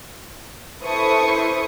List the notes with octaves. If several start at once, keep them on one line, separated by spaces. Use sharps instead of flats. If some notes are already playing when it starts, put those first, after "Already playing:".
E4 A4 B4 C5 C#6 D#6